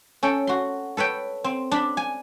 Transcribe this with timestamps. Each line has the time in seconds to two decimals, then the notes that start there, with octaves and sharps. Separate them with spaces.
0.23 C#4 A4 G5
0.47 F#4 C6
0.97 A4 B4 C#5 G5
1.44 C4
1.71 D4 B5
1.97 G#5